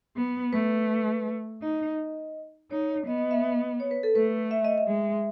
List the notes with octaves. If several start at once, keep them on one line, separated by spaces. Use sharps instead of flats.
B3
A3 B4
D#4 D#5
D#4 C#5
B3 D#5
D#5
E5
D#5
C#5
B4
A4
A3 B4
E5
D#5
E5
G#3